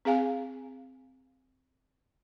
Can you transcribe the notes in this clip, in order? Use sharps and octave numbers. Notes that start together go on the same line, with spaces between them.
C4 G#4 F5 G#5